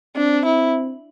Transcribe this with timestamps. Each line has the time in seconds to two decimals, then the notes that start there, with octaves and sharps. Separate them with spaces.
0.16 C4 D4
0.45 E4